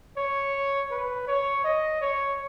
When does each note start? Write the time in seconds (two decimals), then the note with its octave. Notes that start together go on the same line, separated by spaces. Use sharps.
0.17 C#5
0.91 B4
1.27 C#5
1.64 D#5
2.01 C#5